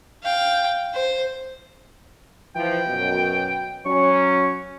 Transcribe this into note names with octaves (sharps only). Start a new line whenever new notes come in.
F5 G5
C5
E3 F3 G5
F#2 B2
F#3 C#4 C#6